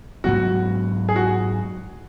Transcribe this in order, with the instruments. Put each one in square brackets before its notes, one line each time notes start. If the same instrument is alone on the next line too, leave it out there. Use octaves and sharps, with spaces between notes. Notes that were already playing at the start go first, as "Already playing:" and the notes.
[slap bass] G#2 F#3 B3 [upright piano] F#4
[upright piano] G#4
F#4